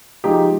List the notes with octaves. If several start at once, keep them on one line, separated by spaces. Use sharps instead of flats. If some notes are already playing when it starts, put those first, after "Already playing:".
F3 G#3 D#4 G4